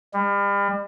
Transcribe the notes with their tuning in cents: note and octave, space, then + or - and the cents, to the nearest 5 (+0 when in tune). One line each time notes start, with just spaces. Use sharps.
G3 +40